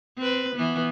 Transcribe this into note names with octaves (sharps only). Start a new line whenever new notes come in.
C4 B4
E3 B3